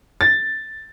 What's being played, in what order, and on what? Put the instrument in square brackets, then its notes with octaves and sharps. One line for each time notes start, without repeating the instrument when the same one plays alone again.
[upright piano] A6